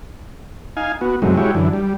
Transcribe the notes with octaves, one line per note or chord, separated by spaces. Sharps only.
D#4 F5 G#5
B3 F#4
F#2 A2 C3 D#3 F#3 G#3
G#3 E4 F#4 G4 C#5
F#2 D3 E3
G3